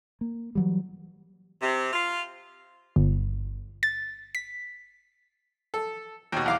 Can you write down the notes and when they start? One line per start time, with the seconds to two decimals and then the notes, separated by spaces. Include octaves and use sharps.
0.21 A#3
0.55 E3 F#3 G3
1.62 C3
1.92 F4
2.96 G1
3.83 A6
4.35 B6
5.74 A4
6.32 D#2 B2
6.46 E2 F5 D6